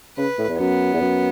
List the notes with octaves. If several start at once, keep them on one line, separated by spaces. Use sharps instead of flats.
C#3 B4
A2
E2
F#2 B3
E2
F#2